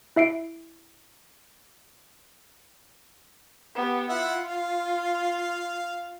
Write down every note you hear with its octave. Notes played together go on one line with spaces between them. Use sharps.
E4 E5 C7 D7
B3 G4
E4 F4 E5 F#5
F5